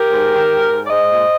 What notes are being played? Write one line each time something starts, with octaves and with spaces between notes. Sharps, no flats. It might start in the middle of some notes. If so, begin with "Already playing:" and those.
Already playing: G4 A#4
G#2
D#3
G#2
G#2
D5
G#3 C5 D#5
A#2